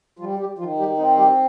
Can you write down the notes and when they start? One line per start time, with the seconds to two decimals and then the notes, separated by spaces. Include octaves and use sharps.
0.19 F3 G3 F4
0.39 G3 G4
0.58 D#3 F3 F4
0.78 G3 G4
0.97 C4 D#4
1.17 G3 G4